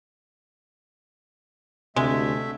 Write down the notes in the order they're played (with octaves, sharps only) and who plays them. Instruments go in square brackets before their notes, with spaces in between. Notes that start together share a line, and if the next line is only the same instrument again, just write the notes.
[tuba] D2 [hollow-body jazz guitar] C3 [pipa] G#3 [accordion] A3 E5